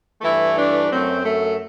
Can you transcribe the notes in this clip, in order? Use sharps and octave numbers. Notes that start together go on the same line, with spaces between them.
G2 E3 A3 E4
D4
F#2 F#3 A3 C4
A3